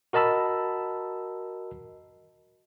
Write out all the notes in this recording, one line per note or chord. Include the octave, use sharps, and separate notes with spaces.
F#4 A#4 D#5 A5 B5 E6